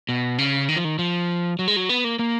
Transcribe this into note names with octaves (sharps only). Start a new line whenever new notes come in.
B2
C#3
D#3
F3
D#3
F3
F#3
G#3
F#3
B3
A#3
A#3